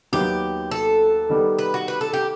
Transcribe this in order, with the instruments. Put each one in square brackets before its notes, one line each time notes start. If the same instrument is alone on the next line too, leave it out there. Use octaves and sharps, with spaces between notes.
[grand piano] D#2 D#3 F#3 B3 [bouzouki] G4
[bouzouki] A4
[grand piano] D#3 G3 B3
[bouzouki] B4
F#4
B4
A4
G4